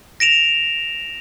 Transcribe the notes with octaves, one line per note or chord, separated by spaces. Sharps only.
A#6 D7 E7 F7